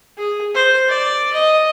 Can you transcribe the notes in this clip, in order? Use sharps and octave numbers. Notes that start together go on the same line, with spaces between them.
G#4
C5
D5
D#5